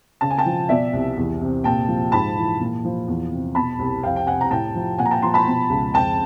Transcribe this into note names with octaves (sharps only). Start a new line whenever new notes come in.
C#3 A5
G#5
G5 A5
F3
B2 D5 E5
C2
E2
C3
A#2 G5 A5
F3
G#2 A5 B5
E3
A#2
F3
E2
C3
B2 A5 B5
C2
F2 F5 G5
G5
C3 F#5 G#5
A#5
A2 G5 A5
F3
A#2 F#5 G#5
A#5
G5 A5
F3 A#5 C6
A5 B5
B2
C#2
F2 G5 A5